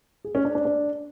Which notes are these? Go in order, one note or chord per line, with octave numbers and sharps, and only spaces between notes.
G#4
C#4
D4
D4
D4